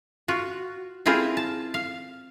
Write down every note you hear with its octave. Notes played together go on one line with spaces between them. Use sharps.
F4 F#4
C4 E4 F4 G#4 A#4 C5
A5
F5